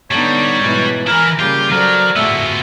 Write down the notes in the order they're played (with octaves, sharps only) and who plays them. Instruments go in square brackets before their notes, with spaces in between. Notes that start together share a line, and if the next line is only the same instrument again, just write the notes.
[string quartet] D3 B3 D#4 [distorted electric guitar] G3 [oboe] C#5
[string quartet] G#2 B2 E3
[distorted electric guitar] E3 E4 [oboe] A#4 [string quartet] G#5 A#5 B5
[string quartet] C#3 G3 A#3 [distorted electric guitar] F4 [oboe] G4
[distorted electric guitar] F#3 [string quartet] A4 C5 D5 [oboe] A#4
[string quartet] A2 F#4 G#4 [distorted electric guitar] B3 F4 [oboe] E5